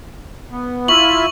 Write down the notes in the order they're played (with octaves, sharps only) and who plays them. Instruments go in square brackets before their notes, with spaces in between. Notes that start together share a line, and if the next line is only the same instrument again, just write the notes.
[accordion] B3
[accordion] E4 F4 E5 [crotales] C#6 F#7